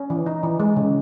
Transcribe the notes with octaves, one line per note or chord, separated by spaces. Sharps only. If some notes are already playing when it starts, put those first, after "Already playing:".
Already playing: C#4
E3
D#4
E3
G#3
C#3